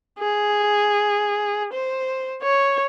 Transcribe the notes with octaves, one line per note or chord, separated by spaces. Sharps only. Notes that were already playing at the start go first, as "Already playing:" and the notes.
G#4
C5
C#5